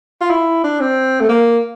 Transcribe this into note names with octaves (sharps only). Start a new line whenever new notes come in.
F4
E4
D4
C4
A3
A#3